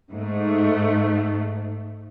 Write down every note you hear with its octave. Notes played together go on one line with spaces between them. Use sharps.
G#2 A3